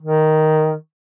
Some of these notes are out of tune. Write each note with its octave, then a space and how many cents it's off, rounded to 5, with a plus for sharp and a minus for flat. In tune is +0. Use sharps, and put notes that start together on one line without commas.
D#3 +0